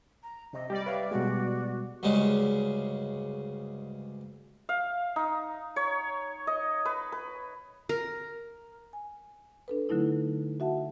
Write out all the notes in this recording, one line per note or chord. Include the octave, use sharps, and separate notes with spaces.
A#5
C3 D#5
G3 G4 D5
B4 C#5 E5 F5
B2 G#3 F#4
D2 G2 C#3 G#3
F5
D#4
C#5
D#5
B4
B4
A#4
G#5
D4 A4 B4
D3 F#3 A3 D#4 E4
F#4 E5 F#5 A5